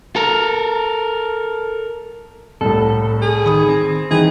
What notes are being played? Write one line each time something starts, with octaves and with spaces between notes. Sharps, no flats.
A4 A#4
C2 A2 A4
G#4
D#3 B5 D#6
C4
D#3 E3 G#4